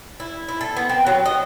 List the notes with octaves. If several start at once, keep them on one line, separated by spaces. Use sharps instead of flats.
E4
E4
A4
B3
C4
F#3
D#5